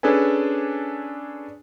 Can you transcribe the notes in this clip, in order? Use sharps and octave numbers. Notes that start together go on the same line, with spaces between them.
C#4 D4 G#4 A4 B4 G#5